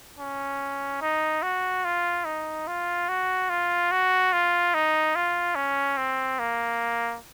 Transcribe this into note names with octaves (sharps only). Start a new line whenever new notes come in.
C#4
D#4
F#4
F4
D#4
F4
F#4
F4
F#4
F4
D#4
F4
C#4
C4
A#3